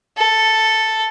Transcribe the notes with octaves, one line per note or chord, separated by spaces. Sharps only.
A4